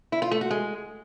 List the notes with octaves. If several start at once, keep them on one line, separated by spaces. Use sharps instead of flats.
E4
F4
A3
F#4
G#3